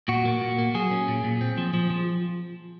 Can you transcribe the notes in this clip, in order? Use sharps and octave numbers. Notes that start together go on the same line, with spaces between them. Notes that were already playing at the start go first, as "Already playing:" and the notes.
A#2 F#4
A#3
A#2
A#3
F#3 G#4
C#4
A#2
A#2
C4
F3
F3
F3